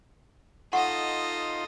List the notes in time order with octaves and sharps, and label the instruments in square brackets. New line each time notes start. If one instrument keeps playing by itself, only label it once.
[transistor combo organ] D#4 F4 C6 [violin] A4 D#5 [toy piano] F#5 C#6